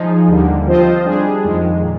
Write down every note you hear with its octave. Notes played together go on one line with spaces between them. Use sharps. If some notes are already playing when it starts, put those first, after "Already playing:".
Already playing: F3 G#3 D#4 G#4
D#2 D3 G3 A#3
F3 C4 F4 C5 D#5
G3 D4 G#4
F2 D#3 G#3
A#2